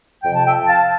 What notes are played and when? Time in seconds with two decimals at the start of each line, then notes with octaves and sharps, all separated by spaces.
0.23 F2 C3 F3 G5
0.35 A5
0.46 E5 G5
0.67 F5 A5